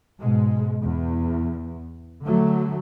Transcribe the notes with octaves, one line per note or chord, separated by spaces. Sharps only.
G#2 B2 G#3
E2
D3 F#3 A3